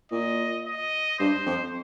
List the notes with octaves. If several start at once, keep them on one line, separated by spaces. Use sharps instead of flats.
A#2 D#5
D#5
G2 C5
F2